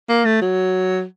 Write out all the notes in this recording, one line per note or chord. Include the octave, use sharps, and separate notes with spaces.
A#3
A3
F#3